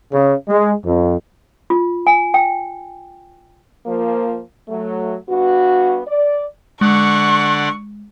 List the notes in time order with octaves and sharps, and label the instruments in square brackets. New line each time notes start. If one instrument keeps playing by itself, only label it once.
[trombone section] C#3
G#3
F2
[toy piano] F4
G#5
G5
[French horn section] F3 A#3
F#3 A3
G2 B3 F#4
D5
[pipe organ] D3 D5 F#5 [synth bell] G#3 [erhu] C#6